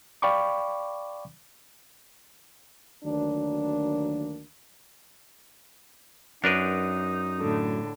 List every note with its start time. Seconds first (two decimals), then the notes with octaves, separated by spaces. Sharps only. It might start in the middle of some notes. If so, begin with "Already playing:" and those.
0.22 D5 F5 G5 B5 C#6 D6
3.04 D2 D#3 F#3 A#3 D4
6.44 F#2 D4 D#4 A#4 B4
7.39 A2 D3